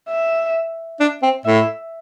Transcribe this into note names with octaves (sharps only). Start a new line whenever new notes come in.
E5
D4
C4
A2 E5